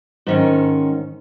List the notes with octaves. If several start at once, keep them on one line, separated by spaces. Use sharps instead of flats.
G#2 D#3 C#4